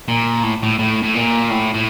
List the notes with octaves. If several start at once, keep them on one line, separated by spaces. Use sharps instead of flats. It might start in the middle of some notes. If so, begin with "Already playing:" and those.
A#2
A2
A2
A2
A2
A#2
A2
A2